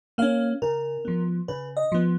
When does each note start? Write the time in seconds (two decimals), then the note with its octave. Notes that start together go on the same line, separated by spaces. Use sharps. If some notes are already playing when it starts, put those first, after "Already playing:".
0.18 A#3 C#4 F5
0.62 C#3 A#4
1.05 F3 B3
1.48 C#3 B4
1.77 D#5
1.92 F3 B3